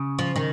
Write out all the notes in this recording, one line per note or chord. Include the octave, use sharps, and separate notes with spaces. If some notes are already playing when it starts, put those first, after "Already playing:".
Already playing: C#3
F3
D#3